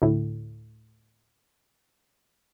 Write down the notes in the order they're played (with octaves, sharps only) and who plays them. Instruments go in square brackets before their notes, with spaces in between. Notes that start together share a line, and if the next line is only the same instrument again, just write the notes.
[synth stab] D2 A2